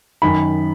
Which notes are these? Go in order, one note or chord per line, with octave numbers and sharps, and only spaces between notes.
F#2 D#3 B5